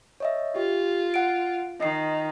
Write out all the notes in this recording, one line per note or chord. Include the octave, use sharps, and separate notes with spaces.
C#5 D#5 E5
F4 G4
F#5 D7
D#3 D#5 C7